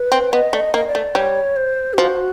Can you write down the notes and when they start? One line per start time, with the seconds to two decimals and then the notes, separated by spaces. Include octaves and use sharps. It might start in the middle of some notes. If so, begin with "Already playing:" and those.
Already playing: B4
0.12 C4
0.32 B3 D#5
0.53 A3 D5
0.60 D#5
0.74 A#3 D#5
0.88 D5
0.95 A3
1.15 G3 C#5
1.56 C5
1.94 G4
1.97 F3 F#4